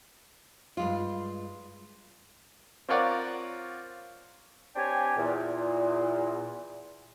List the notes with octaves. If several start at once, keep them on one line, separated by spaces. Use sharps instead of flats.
G2 G#3 F4
C4 F4 A#4 C#5 D5 F#5
C4 D4 G4 C#5 G5 G#5
E2 A#2